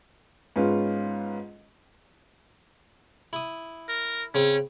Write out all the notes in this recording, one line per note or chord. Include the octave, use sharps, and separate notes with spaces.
G#2 B3 C#4 F4
E4 D#6
A#4
C#3 C4 C#4